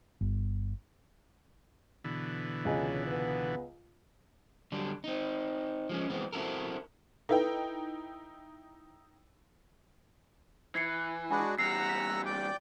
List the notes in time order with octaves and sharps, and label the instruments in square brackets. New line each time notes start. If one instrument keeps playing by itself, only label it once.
[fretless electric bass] G1
[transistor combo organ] B2 D3 E3
[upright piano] C#2 G#4 D#5 [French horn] C#4
[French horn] B3
[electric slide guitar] D3 F#3 G3 D4
C4 D#4
F3 G#3 C#4
E3 G#3 B3 C4
C4 E4 F#4 A4 A#4
[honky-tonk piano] D#4 E4 G5 [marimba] A4 B4
[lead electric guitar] E3 [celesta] G#6 C7 C#7
[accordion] G#3 D4 F#4 [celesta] G#5 B5
[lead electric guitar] E2 G3 [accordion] F#5 A#5 E6 [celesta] C7
[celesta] B6
[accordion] D5 G5